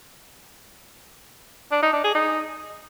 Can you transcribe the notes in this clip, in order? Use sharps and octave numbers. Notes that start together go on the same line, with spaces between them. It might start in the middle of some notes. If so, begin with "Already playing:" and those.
D4
D#4
D4
G#4
D#4